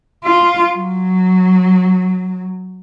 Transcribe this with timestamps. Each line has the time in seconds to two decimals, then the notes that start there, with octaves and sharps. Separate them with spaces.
0.24 F4
0.70 F#3